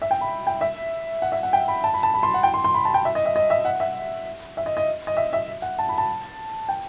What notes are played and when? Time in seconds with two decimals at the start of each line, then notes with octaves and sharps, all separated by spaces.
0.02 E5
0.11 G5
0.21 B5
0.47 G5
0.61 E5
1.22 F#5
1.32 E5
1.43 F#5
1.53 G5
1.68 B5
1.84 A5
1.94 B5
2.03 A5
2.14 B5
2.23 C6
2.34 F#5
2.43 G5
2.54 C6
2.64 C6
2.74 B5
2.85 A5
2.94 G5
3.05 E5
3.15 D#5
3.25 E5
3.36 D#5
3.50 E5
3.65 F#5
3.80 E5
4.57 E5
4.66 D#5
4.77 D#5
5.07 D#5
5.17 E5
5.33 E5
5.62 F#5
5.79 A5
5.89 B5
5.98 A5
6.69 G5